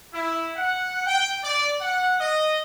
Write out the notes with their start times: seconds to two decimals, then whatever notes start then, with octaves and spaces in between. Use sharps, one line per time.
0.13 E4
0.56 F#5
1.06 G5
1.43 D5
1.81 F#5
2.20 D#5